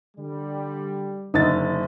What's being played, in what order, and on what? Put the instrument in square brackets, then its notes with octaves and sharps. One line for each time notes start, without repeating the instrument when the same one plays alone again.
[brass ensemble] D3 G3
[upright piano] F#1 D3 A6 [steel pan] D#4